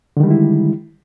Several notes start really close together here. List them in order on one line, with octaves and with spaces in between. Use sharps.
D3 D#3 G3 G#3 E4